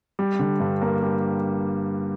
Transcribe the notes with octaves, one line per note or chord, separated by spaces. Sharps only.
G3
D3
G2
A#3
G3